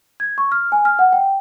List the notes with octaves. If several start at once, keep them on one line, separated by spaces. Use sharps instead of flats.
G#6
C#6
F6
G#5
F6
F#5
G5